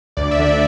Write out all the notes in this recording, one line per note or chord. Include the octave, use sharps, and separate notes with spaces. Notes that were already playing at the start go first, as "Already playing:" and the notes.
D2 D5
E5
D3
D5